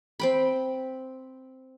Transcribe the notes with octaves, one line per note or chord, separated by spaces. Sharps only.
C4 G5 B5